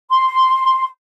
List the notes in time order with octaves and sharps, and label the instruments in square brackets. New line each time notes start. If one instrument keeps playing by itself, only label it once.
[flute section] C6